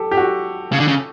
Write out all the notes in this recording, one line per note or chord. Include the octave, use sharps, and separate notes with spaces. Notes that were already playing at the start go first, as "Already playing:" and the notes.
Already playing: G4 A4
G4
F#4
C#3
D3
C#3